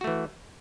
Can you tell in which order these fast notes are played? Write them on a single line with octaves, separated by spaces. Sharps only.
F#4 A3 E3